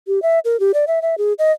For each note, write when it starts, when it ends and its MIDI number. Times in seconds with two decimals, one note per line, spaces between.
0.07 0.22 67
0.22 0.39 76
0.45 0.59 70
0.60 0.72 67
0.74 0.85 74
0.87 1.02 76
1.02 1.15 76
1.18 1.33 68
1.39 1.52 75